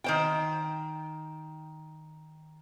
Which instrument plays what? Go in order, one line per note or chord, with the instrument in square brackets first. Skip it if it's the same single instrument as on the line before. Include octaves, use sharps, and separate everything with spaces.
[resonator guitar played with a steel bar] D#3 C5 G5